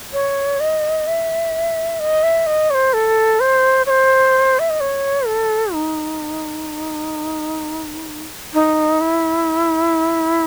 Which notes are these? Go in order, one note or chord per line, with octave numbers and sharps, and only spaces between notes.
C#5
D#5
E5
D#5
E5
D#5
C#5
C5
A4
C5
C#5
C5
E5
D#5
C#5
A4
D#4
D#4
E4